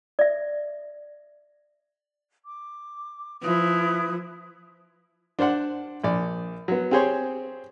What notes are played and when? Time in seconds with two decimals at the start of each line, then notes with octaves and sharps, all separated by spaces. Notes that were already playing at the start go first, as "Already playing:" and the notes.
0.19 D5 E5
2.45 D6
3.42 F3 E4 B4 D#6
5.39 D4 C5 D5 F#5
6.04 A#1 D5
6.68 F#3 B3
6.91 C4 G4 G#4 C5 C#5